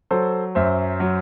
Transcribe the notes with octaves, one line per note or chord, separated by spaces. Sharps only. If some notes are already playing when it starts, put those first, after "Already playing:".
F#3 A4 C5
F#2 C5 E5
F#3